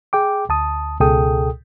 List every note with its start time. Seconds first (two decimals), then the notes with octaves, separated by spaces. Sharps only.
0.13 G#4 G5 D6
0.49 D2 A5 D#6
1.00 C#2 B2 G#4 A4 G5 D#6